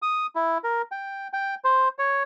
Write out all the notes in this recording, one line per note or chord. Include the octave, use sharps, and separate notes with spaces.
D#6
E4
A#4
G5
G5
C5
C#5